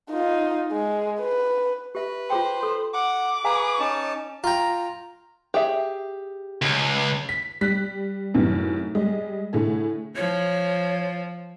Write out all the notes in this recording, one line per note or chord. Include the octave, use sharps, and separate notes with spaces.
D#4 F4
G#3
B4
G4 B4 E5
F4 G#4 C5 G5
A4
F#5 D6
G#4 B4 F5 G#5 A#5
C#4 D#4 A5
F4 G5 A#5
G4 G#4 E5
C#2
B6
G3 F#6 B6
F#2 A2 C3 D#3 B3
G3 G#3 D#5
A2 D3 G#4
F3 C#5